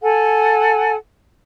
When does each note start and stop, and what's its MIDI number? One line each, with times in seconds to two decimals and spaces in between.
0.03 0.94 69
0.03 0.94 78
0.03 0.94 80